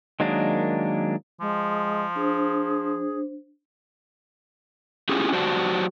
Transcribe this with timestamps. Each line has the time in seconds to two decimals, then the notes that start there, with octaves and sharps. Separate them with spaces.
0.20 D#3 F#3 G#3 A#3 D4
1.41 F3 G#3
2.16 D4 G#4 C5
5.09 A3 C#4 E4 F4 G4 G#4
5.32 F#3 F#4 G4 C5 D5 A5